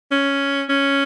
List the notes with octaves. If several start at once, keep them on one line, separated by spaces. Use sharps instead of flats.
C#4
C#4